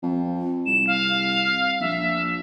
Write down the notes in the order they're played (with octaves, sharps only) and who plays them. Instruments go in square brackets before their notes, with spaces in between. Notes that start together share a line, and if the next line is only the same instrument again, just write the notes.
[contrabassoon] F2
[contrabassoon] C2 [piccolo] E7
[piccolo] F5
[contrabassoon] A#1 [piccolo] E5